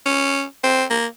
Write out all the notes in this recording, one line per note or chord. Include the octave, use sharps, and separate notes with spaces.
C#4
C4
A#3